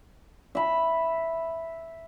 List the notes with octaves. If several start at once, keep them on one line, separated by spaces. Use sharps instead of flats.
E5 B5